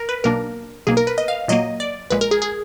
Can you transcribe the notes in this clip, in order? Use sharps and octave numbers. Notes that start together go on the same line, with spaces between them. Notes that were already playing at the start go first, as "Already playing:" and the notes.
Already playing: A#4
B4
B1 B2 A#3 D4 A#4
B1 B2 A#3 G#4
A#4
B4
D#5
F5
A#2 F#3 A#3 D#5
D5
A#1 A#2 G#3 B4
A#4
G#4
G#4